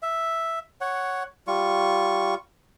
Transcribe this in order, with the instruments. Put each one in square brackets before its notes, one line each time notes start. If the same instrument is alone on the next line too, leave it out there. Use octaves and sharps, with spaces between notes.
[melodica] E5
C#5 F#5
G3 F4 C#6